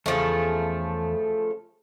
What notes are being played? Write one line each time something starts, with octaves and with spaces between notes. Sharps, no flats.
E2 C#3 F3 A3